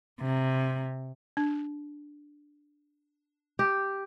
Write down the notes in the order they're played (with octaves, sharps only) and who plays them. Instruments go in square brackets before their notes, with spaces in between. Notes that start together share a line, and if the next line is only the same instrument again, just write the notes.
[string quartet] C3
[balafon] D4
[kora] G4